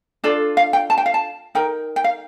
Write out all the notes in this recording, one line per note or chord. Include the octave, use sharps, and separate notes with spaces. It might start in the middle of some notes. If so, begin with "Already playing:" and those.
D4 F4 A4 D5
F5
G5
A5
G5
F5
A5
D#4 A#4 G5
G5
F5